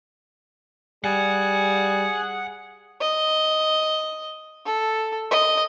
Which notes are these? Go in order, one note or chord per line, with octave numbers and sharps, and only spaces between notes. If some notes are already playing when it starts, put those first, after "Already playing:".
G3 G#4 F#5 G#5
D#5
A4
D#5